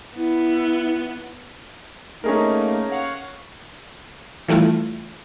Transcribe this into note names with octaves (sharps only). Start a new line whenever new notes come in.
B3 E4
A3 A#3 C#4 D#4 G#4 A#4
C#5 F5 F#5
E3 G3 A3 E4 F4